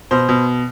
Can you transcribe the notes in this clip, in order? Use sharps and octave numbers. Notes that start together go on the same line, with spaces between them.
B2 C5
B2